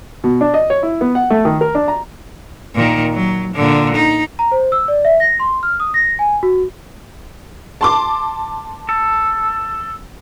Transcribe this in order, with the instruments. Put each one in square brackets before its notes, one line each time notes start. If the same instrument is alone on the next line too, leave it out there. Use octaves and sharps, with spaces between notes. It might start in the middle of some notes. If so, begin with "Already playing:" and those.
[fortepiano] B2
D4
D#5
C#5
E4
B3
F#5
A3
D#3
A#4
D4
A#5
[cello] A#2 D#3
F#3
A#2 D3
D#4
[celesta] A#5
C5
E6
D5
E5
A#6
C6
F6
D#6
A#6
G#5
F#4
[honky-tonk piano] A5 C6 D6
[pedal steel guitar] A4